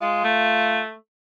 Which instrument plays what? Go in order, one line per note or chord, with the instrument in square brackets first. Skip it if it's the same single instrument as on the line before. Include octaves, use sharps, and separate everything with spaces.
[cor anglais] G#3 [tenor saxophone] F4
[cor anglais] A3